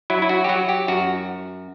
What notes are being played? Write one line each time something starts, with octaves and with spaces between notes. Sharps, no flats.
F#3 E4
E4
F#4
G4
F#3 F#4
G4
F#2 F#4